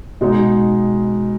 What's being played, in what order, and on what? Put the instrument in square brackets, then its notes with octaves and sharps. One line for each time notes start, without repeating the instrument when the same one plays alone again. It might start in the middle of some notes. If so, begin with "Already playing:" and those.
[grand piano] B2 G#3 D#4